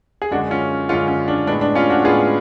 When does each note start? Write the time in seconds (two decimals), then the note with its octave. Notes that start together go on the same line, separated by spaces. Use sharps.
0.22 G#4
0.31 F#2 D3 G#3 D4 F#4
0.50 C#4 F4
0.89 F#2 D3 G#3 C#4 F4
1.08 C#4
1.28 D4
1.47 A2 G#3 B3 D4
1.61 D4
1.75 C#4 F4
1.90 D4 F#4
2.04 A2 G#3 B3 F4 G#4